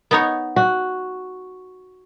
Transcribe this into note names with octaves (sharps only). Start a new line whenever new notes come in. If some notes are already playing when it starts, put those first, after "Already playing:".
B3 D#4 C#5
F#4